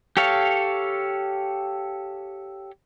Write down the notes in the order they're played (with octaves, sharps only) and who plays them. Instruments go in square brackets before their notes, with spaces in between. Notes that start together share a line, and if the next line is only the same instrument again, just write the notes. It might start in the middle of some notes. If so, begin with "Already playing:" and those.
[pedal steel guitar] G4 A4 C#5 F5